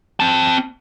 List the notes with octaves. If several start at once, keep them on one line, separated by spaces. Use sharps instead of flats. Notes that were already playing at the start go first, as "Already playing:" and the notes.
C4 A5